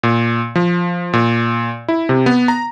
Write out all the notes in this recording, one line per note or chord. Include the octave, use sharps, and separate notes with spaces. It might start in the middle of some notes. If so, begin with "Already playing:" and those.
A#2
F3
A#2
E4
C3
B3
A#5